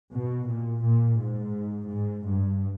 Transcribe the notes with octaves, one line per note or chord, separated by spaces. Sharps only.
B2
A#2
A#2
G#2
G#2
G2